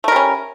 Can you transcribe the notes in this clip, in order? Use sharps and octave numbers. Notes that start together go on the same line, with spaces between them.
G3 A3 C#4 A#4